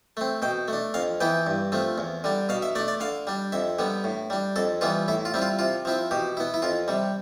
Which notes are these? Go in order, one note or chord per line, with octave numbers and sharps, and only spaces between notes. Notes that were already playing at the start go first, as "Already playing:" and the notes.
A3 C4
B2 G5
A3
D4
F2 F5
E3 B3 E4 G5
G2
F3 A3 C4
E2
D3 G3 D4
B2 F5
E5
A3 D4 D5
D5
D3 F5
G3 D4
F2 E5
D3 G3 B3
A2
G3 D4
F2 A4
E3 G3 B3 F4
A2 E4
F4
G3 C4 E4
F4
C3 F4
F3 C4 E4
B2 G4
B3 E4
E4
F2 F4
C3 G3